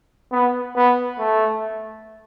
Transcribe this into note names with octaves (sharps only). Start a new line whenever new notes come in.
B3
B3
A3